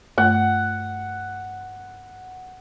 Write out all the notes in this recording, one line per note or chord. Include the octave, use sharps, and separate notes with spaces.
G2 A3 F#5